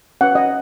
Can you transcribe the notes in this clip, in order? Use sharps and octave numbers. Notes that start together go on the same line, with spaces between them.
C#4 B4 F#5
D#5